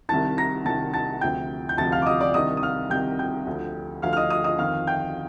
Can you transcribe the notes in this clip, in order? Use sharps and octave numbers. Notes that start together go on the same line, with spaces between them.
C2 C3 D#3 A5 A6
A#5 A#6
C2 C3 D#3 A5 A6
A5 A6
D2 C3 F3 G5 G6
G6
D2 C3 F3 A5 A6
F5 F6
D6
D#5 D#6
D5 D6
C2 C3 D#3 D#5 D#6
D#6
F5 F6
C2 C3 D#3 G5 G6
G5 G6
D2 D3 F3
D2 D3 F3 F5 F6
F6
D#5 D#6
D#5 D#6
D#5 D#6
F2 D#3 F5 F6
G5 G6